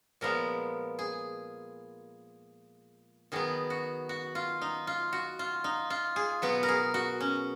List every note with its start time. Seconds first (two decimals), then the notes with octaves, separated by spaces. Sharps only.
0.21 A#2 F3 G#3 B3 A#4
0.99 G#4
3.32 D#3 F#3 B3 G#4
3.70 F#4
4.09 F#4
4.35 F4
4.61 D#4
4.87 F4
5.13 F#4
5.39 F4
5.64 D#4
5.90 F4
6.16 G#4
6.42 B2 F#3 B3 B4
6.63 A#4
6.69 G#4
6.94 F#4
7.20 C#4